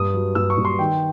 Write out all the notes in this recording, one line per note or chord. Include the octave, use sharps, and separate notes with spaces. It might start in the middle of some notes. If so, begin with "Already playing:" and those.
Already playing: G2 D#6
F#3
G2 E6
C#6
G2
C6
D#3 G5